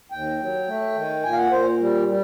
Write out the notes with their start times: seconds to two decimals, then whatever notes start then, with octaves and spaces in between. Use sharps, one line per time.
0.11 D#2 G5
0.40 F#3
0.67 A3
0.95 D#3
1.24 A#2 G#5
1.32 F5
1.37 F#5
1.51 A#2 C5
1.80 G3
2.08 G3